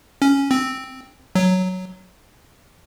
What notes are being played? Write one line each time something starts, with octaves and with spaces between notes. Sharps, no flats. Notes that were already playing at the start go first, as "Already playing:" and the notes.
C#4
C4
F#3